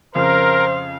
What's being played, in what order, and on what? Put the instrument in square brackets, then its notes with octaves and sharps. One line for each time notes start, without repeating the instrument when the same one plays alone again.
[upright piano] F2 C#3 [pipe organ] A#4 [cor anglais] C5 [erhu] F5